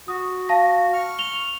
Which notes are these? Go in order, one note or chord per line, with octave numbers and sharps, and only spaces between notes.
F#4 D#6
F5 A5 A#6
C#6 F6
F7 G7